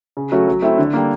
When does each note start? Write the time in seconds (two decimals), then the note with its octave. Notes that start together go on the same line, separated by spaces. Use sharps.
0.17 C#3
0.32 F#3 A3 C#4 F#4
0.48 F#3
0.62 A3 C4 E4
0.78 D3
0.93 G3 A#3